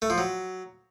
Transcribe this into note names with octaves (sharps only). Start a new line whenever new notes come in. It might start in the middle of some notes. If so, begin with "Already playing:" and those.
A3
F3
F#3